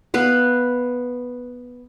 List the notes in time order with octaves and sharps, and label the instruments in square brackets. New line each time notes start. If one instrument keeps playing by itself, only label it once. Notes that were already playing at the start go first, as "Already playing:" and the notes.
[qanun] B3 B4 F5